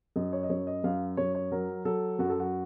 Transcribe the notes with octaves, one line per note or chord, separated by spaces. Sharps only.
F#2 D#5
C#5
D#5
F#2 C#5
D#5
F#2 F5
F#2 C#5
C#5
F#3 A#4
F#3 A4
F#2 F#4
A4
F#4